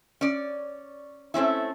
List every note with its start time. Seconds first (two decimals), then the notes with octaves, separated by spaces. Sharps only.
0.21 C#4 D5
1.34 A3 C4 C#4 E4